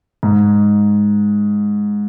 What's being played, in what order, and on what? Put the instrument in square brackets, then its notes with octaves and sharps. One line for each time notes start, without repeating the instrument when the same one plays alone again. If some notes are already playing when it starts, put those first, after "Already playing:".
[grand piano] G#2